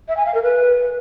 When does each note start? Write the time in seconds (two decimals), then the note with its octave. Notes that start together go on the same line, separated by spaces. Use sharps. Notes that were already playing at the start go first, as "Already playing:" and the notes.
0.08 E5
0.17 G#5
0.26 F5
0.34 A#4
0.43 B4